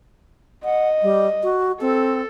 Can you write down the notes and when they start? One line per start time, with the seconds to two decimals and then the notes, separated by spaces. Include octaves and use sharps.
0.65 D#5 F#5
1.03 G3
1.43 F#4
1.81 C4 A4